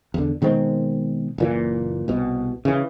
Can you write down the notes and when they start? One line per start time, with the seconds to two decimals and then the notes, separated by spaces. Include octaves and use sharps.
0.14 E2 D3
0.42 B2 D#3 G#3 C4
1.38 F#1 A#2 E3
2.08 C2 B2
2.65 C#3 E3